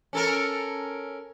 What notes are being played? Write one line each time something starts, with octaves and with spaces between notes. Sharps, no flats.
C#4 A4 A#4